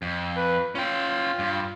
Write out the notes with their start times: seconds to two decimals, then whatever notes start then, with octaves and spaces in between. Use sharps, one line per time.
0.02 F2
0.37 B4
0.75 C#4 F4 G5
1.39 G2